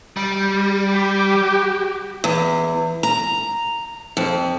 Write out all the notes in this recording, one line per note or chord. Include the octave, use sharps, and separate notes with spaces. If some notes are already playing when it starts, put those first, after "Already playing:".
G3
G4
E2
A#5
F2